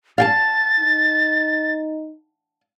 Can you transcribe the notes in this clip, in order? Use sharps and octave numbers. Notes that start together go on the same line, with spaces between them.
F5 G5 A5 A6
D#4